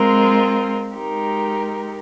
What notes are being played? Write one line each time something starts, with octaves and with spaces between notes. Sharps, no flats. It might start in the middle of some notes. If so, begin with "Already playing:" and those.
Already playing: G#3 C4 F4 A#4
G#3 D#4 G4 A#4